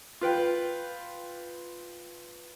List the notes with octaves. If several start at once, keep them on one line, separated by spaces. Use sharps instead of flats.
F4 B4 G5